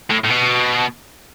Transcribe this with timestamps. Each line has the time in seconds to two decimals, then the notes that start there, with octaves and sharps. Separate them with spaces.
0.11 A2
0.25 A2
0.30 B2